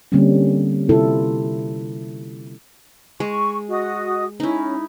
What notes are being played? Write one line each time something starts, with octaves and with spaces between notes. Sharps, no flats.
D3 G3 A#3 C4 C#4
C3 E4 F4 A4
G#3 C#6
F#4 D#5 D#6
C#4 D#4 E4